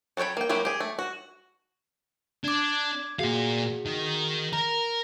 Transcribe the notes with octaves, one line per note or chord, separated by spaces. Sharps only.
F#3 A4 C#5 G5 B5
A#3 G5
F#3 G#3 A#3 E4 G4
G4 G#4
A3
F#4
D4 D6 G#6
A#2 F#4 G#4 F5
D#3
A#4 A#5